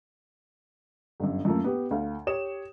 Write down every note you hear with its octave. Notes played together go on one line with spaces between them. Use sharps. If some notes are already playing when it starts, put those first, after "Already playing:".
G1 F#2
F#2 F3 A3 A#3
B3 G4
D2 F5
G4 C#5 D#6 E7